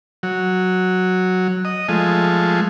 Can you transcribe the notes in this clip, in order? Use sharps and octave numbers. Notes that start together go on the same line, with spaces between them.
F#3
D#5
F3 G#3 A3